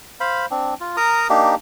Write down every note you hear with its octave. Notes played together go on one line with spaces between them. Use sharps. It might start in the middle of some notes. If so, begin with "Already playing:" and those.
C5 F5 B5
C4 D4
F4
A#4 A#5 D#6
A#3 D4 D#4 G4